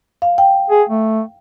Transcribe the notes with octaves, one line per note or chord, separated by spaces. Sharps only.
F5
G5
G#4
A3